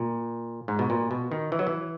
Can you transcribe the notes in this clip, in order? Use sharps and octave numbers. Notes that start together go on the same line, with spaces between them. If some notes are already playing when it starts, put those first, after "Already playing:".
Already playing: A#2
G#2
B2
A#2
B2
D#3
E3
F#3
E3